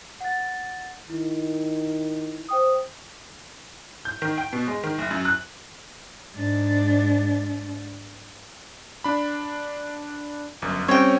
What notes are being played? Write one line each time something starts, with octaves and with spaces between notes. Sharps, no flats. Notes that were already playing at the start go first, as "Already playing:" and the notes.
F#5 A6
D#3 E4
C5 G5 D#6
G6
D#3
G5
B2
G#3
D#3
F#1
F#2
F#6
G#2 D4
D4 B5
G1 F#2
G3 C4 C#4 C#5 G5